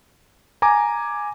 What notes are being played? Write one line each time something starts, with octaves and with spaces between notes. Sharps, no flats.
G#5 A#5 D6